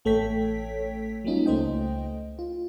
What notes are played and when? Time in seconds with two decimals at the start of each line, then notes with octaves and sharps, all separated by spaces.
0.05 A1 A3 A4 C#5 G5 B6
1.24 F#3 G3 A#3 C#4 D#4 F4
1.46 C#2 A3 C5 D#5 G5
2.39 F4